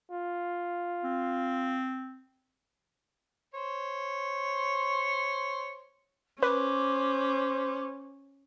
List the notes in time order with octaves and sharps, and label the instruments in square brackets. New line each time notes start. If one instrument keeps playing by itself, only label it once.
[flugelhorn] F4
[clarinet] C4
[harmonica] C5 C#5
[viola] C#4 [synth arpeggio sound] B4 [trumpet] C5 [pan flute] D6